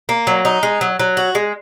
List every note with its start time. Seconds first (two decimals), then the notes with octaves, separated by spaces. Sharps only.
0.09 A#3
0.27 F#3
0.45 D#4
0.63 G#3
0.81 F#3
1.00 F#3
1.17 F#4
1.35 G#3